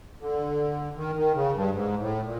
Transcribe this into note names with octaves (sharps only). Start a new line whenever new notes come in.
D3
D#3
D#3
C#3
G2
G#2
A2
A#2